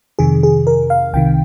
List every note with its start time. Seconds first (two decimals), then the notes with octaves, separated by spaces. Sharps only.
0.19 F2 C3 D#3 G#4
0.43 G#4
0.67 A#4
0.90 F5
1.13 C2 C3 D#3 G5